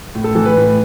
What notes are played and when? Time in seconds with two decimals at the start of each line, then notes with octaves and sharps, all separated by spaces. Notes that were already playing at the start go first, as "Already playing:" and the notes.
0.15 A2
0.24 A4
0.35 E3 A4
0.45 B4
0.57 A2